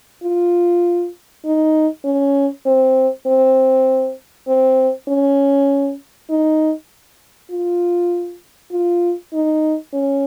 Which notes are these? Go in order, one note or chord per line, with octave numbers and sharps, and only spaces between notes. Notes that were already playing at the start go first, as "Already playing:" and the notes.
F4
D#4
C#4
C4
C4
C4
C#4
D#4
F4
F4
D#4
C#4